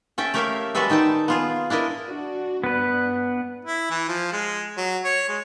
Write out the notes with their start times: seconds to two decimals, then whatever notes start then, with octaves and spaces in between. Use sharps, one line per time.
0.18 C#4 A4 E5 G5
0.34 A3 G4 A#4 C#5 E5 F5
0.75 G3 G#3 F#4 A4 B4 E5
0.90 D#3 D#4 G5 A5
1.28 B3 F4 G#4
1.70 D4 E4 A#4 D#5
2.05 D4 F#4
2.64 G2 B3 D4 B4 F#6
3.65 E4
3.90 E3
4.08 F3
4.33 G#3
4.78 F#3
5.04 C#5
5.29 G#3